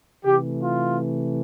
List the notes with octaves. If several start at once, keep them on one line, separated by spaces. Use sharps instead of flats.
C3 E3 A3 G4
F4